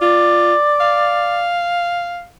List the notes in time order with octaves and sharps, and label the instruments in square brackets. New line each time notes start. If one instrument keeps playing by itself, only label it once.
[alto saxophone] F4 [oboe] D5
[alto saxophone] F5